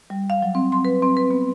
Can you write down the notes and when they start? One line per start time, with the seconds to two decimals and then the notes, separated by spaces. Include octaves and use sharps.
0.10 G3
0.30 F5
0.42 F#3
0.55 C4
0.72 C6
0.85 B4
1.03 C4
1.17 B4
1.31 B3